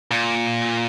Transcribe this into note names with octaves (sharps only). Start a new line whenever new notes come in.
A#2